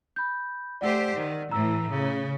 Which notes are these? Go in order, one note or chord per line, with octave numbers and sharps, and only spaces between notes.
B5 G6
A3 G4 C5 D5 F#5 E6
D#3
A2 E3 A#5 E6
C#3